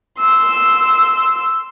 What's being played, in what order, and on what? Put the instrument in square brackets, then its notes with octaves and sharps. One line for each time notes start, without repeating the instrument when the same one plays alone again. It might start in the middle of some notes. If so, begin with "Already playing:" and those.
[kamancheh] C6 E6